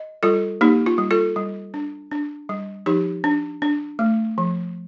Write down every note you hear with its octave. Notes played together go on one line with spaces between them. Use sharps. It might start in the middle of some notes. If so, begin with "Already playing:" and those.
Already playing: D#5
G3 F4 A4
A#3 D#4 G4
F4
G3
F4 A4
G3
D4
D4
G3
F3 D#4 G4
D4
D4
A3
F3